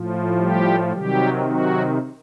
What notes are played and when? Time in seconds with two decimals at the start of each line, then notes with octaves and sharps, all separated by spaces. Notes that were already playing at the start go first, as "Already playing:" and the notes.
Already playing: A2 F3
0.38 G3 G4
0.91 C3 D#3 F#3 G3 G4
1.45 F#3 F#4